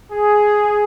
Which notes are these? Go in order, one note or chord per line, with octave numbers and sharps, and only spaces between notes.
G#4